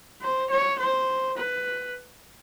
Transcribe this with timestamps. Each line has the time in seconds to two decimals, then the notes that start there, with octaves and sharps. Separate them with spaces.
0.21 C5
0.50 C#5
0.79 C5
1.37 B4